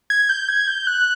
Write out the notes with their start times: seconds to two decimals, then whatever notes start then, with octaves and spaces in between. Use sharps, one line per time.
0.10 G#6
0.29 G6
0.48 G#6
0.67 G6
0.87 F#6